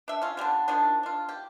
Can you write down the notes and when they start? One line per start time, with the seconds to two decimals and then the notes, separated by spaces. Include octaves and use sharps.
0.08 D4 E5
0.22 C#4 F4
0.37 D3 G3 B3 D4
0.68 D#3 F3 D4
1.03 D4 F4
1.29 G4